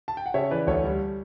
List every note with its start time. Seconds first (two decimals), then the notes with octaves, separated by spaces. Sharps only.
0.08 A5
0.17 G5
0.26 F#5
0.34 C#3 C#5 E5
0.51 E3 B4 D5
0.67 D2 A4 C#5
0.84 G3